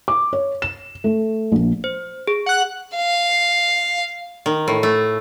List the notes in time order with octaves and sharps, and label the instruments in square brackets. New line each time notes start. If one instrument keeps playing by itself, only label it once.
[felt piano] D6
C#5
E7
A3
A#1
[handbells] C5
G#4
[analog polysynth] F#5 F#6
[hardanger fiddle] F5
[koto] D#3
A2
A3